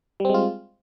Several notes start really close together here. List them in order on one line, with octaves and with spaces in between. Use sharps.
G3 C4 G#3 F4